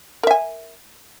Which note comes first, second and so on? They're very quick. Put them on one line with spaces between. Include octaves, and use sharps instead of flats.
A#4 E5 G#5